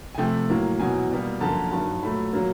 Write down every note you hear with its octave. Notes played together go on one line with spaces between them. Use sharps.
G#5
C3 F3 A3 G5
A2 F#3 A#3
E2 B2 F#3 G#5
B2 G3 A#3
F#2 D3 F3 A#3 A5
G2 D#3 F#3 A5
A#2 F#3 A3 B5
A#2 F#3 A#3